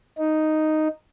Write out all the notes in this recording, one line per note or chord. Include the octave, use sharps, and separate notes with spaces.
D#4